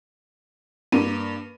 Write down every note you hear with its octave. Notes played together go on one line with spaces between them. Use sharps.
G2 A#3 A#4 D#7